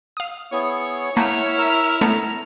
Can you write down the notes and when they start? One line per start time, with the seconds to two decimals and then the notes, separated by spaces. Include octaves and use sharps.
0.17 F5 D#6
0.52 B3 E4 G#4 C#5
1.17 A3 A#3 E4 F#5 F6
1.58 A#4 E5
2.01 A3 B3 C#5 A#5